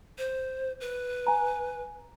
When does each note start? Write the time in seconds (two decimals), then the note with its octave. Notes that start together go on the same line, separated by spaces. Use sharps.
0.18 C5
0.81 B4
1.27 G#5 A#5